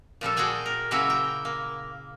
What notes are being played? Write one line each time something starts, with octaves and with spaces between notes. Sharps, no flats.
A#2 F3 G3 A4
F#4 G#4 D5 G5 G#5
A#4
C#3 F#3 A#3 E4 F#4 E5
G5
A#3